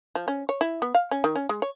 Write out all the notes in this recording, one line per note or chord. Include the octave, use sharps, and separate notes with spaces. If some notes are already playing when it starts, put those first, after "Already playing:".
F3
C#4
C#5
E4
B3
F5
C#4
D#3
C#4
G#3
C#5